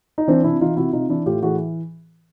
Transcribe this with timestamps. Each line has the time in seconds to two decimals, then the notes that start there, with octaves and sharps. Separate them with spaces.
0.18 D#4
0.28 E3 C4 D4
0.44 C3 D4 E4
0.61 E3 D#4 F4
0.76 C3 E4 F#4
0.93 C3 D#4 F4
1.09 E3 D4 E4
1.26 A2 F4 G4
1.43 E3 F#4 G#4